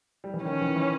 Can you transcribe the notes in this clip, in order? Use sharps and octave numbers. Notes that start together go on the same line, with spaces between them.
G3
E3
D#3 C#4
E3
E3